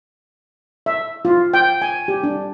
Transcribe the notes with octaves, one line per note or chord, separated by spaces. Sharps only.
E5
F4
G5
G#5
G4
D4